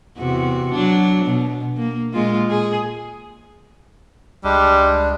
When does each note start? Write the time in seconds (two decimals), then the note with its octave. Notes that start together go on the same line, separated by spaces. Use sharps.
0.18 E2 C3 F#4
0.72 F#3 D4
1.25 B2
1.77 A#3
2.13 A#2 G#3 F4
2.50 G#4
4.44 C#2 G3 G#3 D4